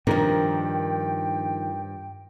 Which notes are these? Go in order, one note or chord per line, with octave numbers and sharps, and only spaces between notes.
G2 D#3 F3 D4 A#4 G5